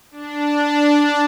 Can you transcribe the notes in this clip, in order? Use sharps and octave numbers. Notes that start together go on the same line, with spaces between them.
D4